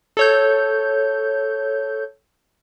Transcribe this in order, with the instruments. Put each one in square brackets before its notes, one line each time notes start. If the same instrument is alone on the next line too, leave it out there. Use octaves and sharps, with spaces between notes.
[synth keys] A4 C#5 G6